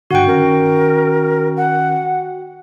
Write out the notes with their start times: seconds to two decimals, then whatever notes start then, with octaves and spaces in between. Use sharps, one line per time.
0.11 G2 D3 F#4 F#5 G5
0.27 D#3 C#4 A#4
1.57 F#5